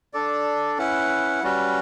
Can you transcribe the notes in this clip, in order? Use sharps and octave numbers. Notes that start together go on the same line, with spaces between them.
D4 A4 D5
C#4 E4 B4 F#5
G3 C#4 F#4 B4